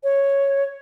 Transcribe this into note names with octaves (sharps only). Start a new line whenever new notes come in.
C#5